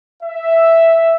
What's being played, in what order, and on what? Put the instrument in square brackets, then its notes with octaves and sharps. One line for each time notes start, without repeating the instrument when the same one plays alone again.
[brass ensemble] E5